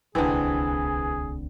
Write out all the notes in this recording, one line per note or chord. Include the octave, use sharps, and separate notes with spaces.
D1 C2 D3 E3 C4 G#4